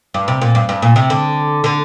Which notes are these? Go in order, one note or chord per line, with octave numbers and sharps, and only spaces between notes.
G2
C3
A#2
G2
G2
A#2
C3
D3
D3